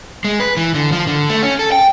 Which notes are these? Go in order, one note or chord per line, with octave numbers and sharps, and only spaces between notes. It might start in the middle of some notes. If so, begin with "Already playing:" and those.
G#3
B4
E3
D3
F3
D3
A3
C#4
A4
G5